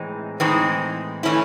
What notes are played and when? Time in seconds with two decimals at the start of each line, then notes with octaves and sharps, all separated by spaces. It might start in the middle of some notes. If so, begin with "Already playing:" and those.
Already playing: A2 E3 G#3 C4 D#4
0.40 A2 E3 G#3 C4 D#4
1.23 E3 A3 C#4 E4